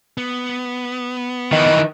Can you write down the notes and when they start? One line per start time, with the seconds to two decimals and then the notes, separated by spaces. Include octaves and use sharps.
0.18 B3
1.52 D#3 E3 D#5